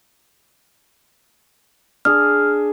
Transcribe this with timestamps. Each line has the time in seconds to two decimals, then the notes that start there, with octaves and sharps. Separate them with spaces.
2.05 D4 G#4 F6